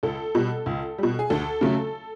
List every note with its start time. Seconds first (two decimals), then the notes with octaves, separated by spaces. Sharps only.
0.03 C#2 A4
0.35 B2 G3
0.66 C#2
0.98 B2 G3
1.19 G#4
1.30 D2 A4
1.61 C#3 F#3 A3